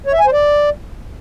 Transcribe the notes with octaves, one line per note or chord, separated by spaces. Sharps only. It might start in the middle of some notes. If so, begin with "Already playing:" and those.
C#5
E5
G#5
C5
D5